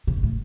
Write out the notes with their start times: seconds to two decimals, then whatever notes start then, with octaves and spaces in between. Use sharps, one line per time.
0.07 C3
0.17 G2
0.23 A2